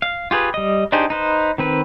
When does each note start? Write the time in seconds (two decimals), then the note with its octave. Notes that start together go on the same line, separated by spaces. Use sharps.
0.02 F5
0.31 F4 G4 G#4 B4
0.54 G3 D#5
0.92 D4 D#4 G4 G#4 C5
1.10 D#4 B4 C5
1.58 D#3 C4 B4